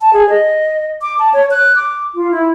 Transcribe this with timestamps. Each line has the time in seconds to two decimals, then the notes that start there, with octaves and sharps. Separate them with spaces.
0.01 A5
0.13 G#4
0.29 D#5
1.02 D6
1.19 A5
1.33 C#5
1.51 F#6
1.76 D6
2.15 F4
2.31 E4